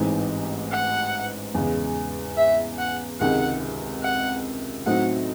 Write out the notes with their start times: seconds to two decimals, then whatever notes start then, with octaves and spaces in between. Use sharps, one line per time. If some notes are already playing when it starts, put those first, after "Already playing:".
Already playing: A1 G#2 E3 C4 D#4
0.72 F#5
1.55 E2 C#3 G#3
2.37 E5
2.79 F#5
3.20 C#2 C3 D#3 G#3 F#5
4.03 F#5
4.86 A2 F#3 C4 D#4 F#5